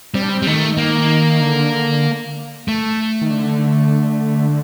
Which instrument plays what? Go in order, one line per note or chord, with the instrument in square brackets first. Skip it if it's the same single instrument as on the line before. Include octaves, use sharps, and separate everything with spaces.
[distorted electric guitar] G3 [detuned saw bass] C4
[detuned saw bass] D4
C4
[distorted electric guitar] G3
[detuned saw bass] D#3 [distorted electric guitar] A3
[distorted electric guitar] A#3
[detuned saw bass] D3
[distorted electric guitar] A3
[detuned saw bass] D#3
D3